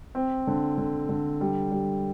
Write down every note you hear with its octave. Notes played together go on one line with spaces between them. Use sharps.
C4
D3
D3
D3
G3
G3